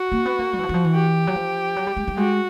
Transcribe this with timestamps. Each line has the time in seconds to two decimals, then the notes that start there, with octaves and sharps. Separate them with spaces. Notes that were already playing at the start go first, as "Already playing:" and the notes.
Already playing: F#4
0.12 A#3
0.25 B3
0.39 A#3
0.53 G3
0.58 E3
0.63 F3
0.69 E3
0.74 F3
0.84 E3
0.95 G4
1.27 F#3
1.35 F3
1.76 F#3
1.87 G3
1.97 G#3
2.08 G3
2.17 G#3 F#4